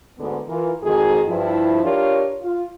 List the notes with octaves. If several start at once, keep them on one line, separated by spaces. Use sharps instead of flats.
D2 G#2 D3 B3
E3 F4 A#4
F2 G#2 D#3 F#4 G#4
G2 F3 E4
D4 F4 G4 A#4 C#5
F4